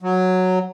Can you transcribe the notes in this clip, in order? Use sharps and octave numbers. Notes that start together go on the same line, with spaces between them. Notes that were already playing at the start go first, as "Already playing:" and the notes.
F#3